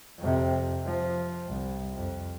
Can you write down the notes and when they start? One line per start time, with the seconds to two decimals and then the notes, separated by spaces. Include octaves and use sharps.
0.19 F2 C3
0.85 F3
1.47 C2
1.94 F2